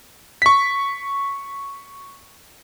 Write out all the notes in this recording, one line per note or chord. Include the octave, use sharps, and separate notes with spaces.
C#6 B6